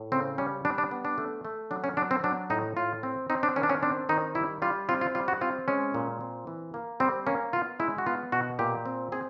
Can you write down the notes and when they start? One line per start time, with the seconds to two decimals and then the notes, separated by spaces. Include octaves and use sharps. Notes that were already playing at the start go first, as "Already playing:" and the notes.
Already playing: A2
0.12 C#3 C4
0.38 G3 C#4
0.65 G3 D4
0.78 D4
0.91 B3
1.05 D4
1.18 A3
1.45 A3
1.71 F#3 D4
1.84 C#4
1.97 F#3 D4
2.11 C4
2.24 F#3 D4
2.50 A2 D#4
2.77 A2 F4
3.03 C4
3.30 C4 D#4
3.43 D4
3.56 D#3 C#4
3.63 D4
3.70 C#4
3.83 C4 D4
4.09 D#3 D#4
4.35 G3 E4
4.62 G3 F4
4.89 C4 F4
5.01 F4
5.15 G3 F4
5.28 F#4
5.41 C4 F4
5.68 G#3 C#4
5.94 A#2
6.21 C4
6.47 E3
6.74 A#3
7.00 G3 C4
7.27 A#3 C#4
7.53 B3 F4
7.80 G#3 E4
7.98 F#4
8.06 B3 F4
8.32 B2 F#4
8.59 A#2 G4
8.86 C4
9.12 C4 G#4